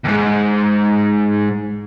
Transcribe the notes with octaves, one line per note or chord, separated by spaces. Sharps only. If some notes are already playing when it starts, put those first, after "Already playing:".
D#2 G#2